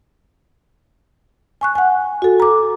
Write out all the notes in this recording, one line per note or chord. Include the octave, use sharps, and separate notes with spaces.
G#5 C#6 F#6
F#5 G#5
F#4 A4
A#5 D6